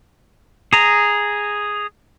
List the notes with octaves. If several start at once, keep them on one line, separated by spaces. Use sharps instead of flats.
G#4 A#5